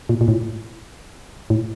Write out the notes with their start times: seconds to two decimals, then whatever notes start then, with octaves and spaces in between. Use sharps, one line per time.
0.09 A#2
0.21 A#2
0.28 A2
1.50 A2